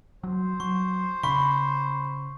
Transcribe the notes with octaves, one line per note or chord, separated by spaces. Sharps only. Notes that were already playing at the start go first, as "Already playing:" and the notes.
F#3 C5
F#3 C#6
C#3 B5 C#6